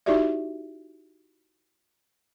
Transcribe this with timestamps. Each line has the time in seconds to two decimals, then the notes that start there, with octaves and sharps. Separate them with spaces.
0.06 D#4 E4 F#4 G4 D5 E5